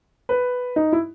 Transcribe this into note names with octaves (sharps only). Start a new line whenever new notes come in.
B4
D#4
E4